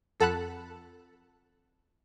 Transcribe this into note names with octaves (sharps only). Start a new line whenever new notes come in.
F2 A4 F#5 A5 B5 F#6